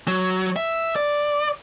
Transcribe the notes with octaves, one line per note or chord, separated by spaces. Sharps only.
F#3
E5
D5